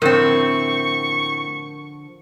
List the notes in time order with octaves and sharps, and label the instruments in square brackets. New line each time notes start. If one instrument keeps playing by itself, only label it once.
[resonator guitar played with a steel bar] A2 C4 [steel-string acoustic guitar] D3 F3 [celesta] A#4 [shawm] C#6